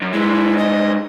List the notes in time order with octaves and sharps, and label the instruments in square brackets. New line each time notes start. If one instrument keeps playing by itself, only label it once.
[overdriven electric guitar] F#2
[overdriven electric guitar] G2 G#3 [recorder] E4
[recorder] D#5